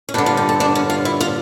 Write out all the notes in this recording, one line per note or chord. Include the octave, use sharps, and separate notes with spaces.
C#4
G2 D3 D4
F4
G4
A4
D4
C#4
F4
E4
F4